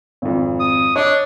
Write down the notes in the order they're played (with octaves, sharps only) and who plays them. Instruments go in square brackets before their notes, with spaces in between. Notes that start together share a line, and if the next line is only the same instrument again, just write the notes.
[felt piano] G#1 F2
[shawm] D#6
[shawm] D4 [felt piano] C#5 D#5 D#6